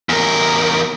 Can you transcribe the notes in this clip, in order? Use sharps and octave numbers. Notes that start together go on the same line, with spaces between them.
E2 A#4